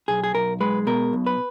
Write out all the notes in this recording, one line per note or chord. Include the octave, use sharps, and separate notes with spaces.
B1 G#4
G#4
B1 A#4
G#3 B4
B2 A#4
B1
B4